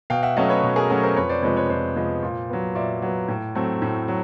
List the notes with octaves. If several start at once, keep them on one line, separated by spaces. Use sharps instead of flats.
B2 F5 G5
E5 F#5
F#3 A3 C#4 D#5 F5
B4 C#5
B2
G#4 A#4
F#3 A3 C#4
A#4 C5
F2 B4 C#5
C5 D5
C3 F3 G#3 B3 B4 C#5
B4 C#5
F2 C5 D5
C3 F3 G#3 B3
A#2
F#3 B3
A#2 D5 E5
F#3 B3
A2
F#3 A3 C4
A2
F#3